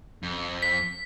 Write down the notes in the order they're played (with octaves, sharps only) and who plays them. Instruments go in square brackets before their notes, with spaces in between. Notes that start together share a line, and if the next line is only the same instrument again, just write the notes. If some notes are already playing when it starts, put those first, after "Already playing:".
[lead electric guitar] F2
[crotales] B6